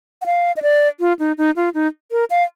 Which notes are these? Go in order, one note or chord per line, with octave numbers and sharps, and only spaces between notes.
F#5
F5
D#5
D5
F4
D#4
D#4
F4
D#4
A#4
F5